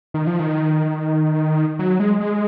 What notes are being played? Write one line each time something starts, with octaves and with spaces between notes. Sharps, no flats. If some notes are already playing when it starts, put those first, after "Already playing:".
D#3
F3
D#3
F#3
G#3
G#3